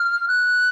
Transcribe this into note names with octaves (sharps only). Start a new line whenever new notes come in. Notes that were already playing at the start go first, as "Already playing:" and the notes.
Already playing: F6
F#6